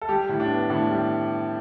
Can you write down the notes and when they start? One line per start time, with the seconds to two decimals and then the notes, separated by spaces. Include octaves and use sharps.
0.01 A4
0.09 G3 G4
0.29 A2
0.40 D4
0.50 B3
0.70 A2 D4
0.90 G3